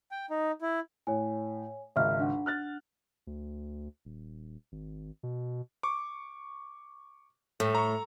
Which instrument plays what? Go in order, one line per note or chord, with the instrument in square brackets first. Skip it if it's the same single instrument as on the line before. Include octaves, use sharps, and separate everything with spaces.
[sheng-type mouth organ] G5
D#4
E4
[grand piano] A2 [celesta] C#5 G#5
[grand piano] G#1 C#2 [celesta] D#5 E5 F6
[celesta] D4 F#5
[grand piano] F6 F#6 A6
[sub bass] D2
D#1
G#1
B2
[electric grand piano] C#6 D6
[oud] A2 [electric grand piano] A3
[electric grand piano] A#5 C#6